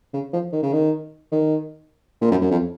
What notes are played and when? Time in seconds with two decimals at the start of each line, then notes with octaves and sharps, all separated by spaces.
0.14 C#3
0.33 F3
0.53 D#3
0.63 C#3
0.73 D#3
1.32 D#3
2.21 A#2
2.31 F#2
2.41 F#2
2.51 F2